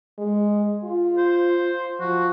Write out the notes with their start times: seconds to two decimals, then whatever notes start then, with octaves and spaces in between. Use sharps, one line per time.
0.19 G#3
0.84 F4
1.17 C5
2.00 F3 F#4